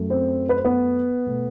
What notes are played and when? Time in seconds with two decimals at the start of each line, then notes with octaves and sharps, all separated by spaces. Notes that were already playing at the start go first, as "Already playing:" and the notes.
Already playing: F#2 F#3 A3
0.10 C4 C5
0.49 B4
0.57 C5
0.64 B3 B4
1.26 B2 A3